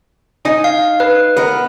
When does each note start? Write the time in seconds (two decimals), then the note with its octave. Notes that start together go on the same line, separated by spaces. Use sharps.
0.45 D#4 D#5 G#5
0.64 F5
1.00 B4
1.37 B3 A#4